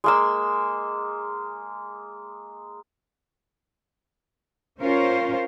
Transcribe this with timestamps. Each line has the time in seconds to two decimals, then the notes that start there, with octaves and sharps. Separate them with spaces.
0.04 G#3 A#3 E6
4.80 C#4 F4 A#4 C5 C#5